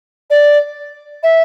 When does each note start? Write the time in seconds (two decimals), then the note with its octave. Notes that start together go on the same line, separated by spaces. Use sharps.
0.30 D5
1.23 E5